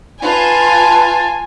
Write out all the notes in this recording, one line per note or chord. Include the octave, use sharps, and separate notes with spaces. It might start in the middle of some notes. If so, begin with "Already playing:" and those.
F4 B4 G#5 A5